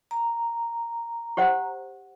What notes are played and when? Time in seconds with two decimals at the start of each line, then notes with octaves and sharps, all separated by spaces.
0.11 A#5
1.37 G4 C5 F#5